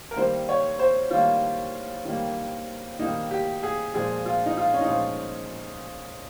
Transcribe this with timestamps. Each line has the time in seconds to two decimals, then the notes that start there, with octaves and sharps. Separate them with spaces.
0.11 A#4
0.16 D#3 G3 A#3 C5
0.49 C#5
0.79 C5
1.11 D#3 G3 A#3 F4
2.05 D#3 G3 A#3
2.99 D#3 G3 A#3 D#4
3.31 G4
3.63 G#4
3.94 A#2 F3 G#3 G#4
4.26 F4
4.46 D#4
4.57 F4
4.73 C#4
4.81 D#4
4.88 A#2 F3 G#3 F4